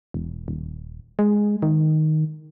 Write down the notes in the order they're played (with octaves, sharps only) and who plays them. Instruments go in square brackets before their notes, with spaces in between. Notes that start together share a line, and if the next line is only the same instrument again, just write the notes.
[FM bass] E1
D#1
G#3
D#3